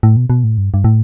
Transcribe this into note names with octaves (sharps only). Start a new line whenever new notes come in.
A2
B2
B2
A2
G2
G2
A2